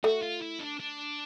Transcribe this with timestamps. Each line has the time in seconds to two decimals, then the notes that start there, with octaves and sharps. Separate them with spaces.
0.04 A3 F#4
0.22 F4
0.41 E4
0.60 D4
0.80 D4